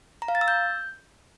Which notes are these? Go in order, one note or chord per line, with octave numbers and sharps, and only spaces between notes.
A#5
F5
A6
E6
G6